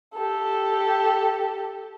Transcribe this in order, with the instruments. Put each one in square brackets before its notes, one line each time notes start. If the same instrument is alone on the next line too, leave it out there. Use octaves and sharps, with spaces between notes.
[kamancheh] G4 A4